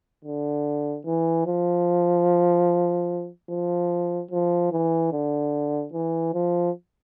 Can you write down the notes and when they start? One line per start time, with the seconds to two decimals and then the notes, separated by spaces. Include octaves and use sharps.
0.24 D3
1.05 E3
1.46 F3
3.50 F3
4.31 F3
4.72 E3
5.12 D3
5.93 E3
6.34 F3